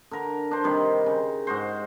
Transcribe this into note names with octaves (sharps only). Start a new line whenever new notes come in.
D3 A#4
D4 C5
C3 D#3 G3
C#3
G#2 F#4 C5